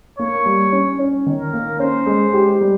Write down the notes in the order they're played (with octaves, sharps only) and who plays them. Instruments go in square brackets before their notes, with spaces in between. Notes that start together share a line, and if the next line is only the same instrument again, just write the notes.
[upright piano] A#3 [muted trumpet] C#5
[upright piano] G3
C#4
C#4
D#3
[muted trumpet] A#4
[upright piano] A#3
[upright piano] C#4 [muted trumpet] C5
[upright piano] G#3
G4
G3